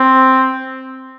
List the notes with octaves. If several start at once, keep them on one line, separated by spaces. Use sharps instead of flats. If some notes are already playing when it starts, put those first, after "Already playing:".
Already playing: C4